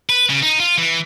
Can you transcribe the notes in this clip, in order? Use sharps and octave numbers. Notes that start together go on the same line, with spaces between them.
B4
C#3
D#4
F4
E3